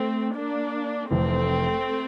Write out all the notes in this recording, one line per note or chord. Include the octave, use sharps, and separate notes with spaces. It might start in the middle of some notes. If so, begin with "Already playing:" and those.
Already playing: A3 C4
A#3 D4
F1 F2 E3 A3 C4